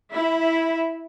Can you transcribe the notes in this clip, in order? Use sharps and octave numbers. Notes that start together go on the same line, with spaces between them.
E4